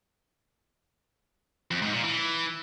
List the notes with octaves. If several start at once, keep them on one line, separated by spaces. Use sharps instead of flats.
F2
G#2
A#2
E3